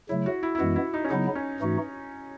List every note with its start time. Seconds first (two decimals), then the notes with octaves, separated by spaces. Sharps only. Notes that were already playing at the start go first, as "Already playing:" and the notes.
0.09 C#3 F#3 A3 E4
0.26 F#4
0.43 E4
0.55 E4
0.59 F#2 E3 G#3 B3 F#4
0.76 E4
0.94 D#4
1.04 C#4
1.10 C#3 F#3 B3 D#4 E4
1.35 C#4
1.60 G#2 E3 A3 D#4 F#4